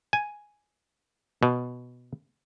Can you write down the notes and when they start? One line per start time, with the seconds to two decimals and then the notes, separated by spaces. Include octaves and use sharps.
0.13 G#5
1.43 B2